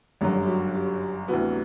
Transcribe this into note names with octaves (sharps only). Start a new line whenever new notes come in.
G1 F#2 D3 F#3 G4
G4
F#4
G4
D2 C3 E3 B3 F#4